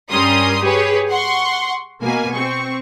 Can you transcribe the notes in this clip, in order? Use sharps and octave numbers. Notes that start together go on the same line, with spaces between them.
G2 G3 C#4 A#4 C6 D#6
G4 G#4 B4 C#5
F#5 C6 C#6
B2 A#3 G#5
C4 C#6